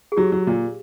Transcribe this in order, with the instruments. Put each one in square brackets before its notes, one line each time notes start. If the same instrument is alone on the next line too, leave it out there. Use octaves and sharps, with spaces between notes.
[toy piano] G#4
[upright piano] F#3 [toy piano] G4
[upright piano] F#3
A#2